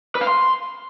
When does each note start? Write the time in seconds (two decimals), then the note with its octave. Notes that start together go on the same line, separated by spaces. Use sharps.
0.15 B4
0.21 F5
0.27 C6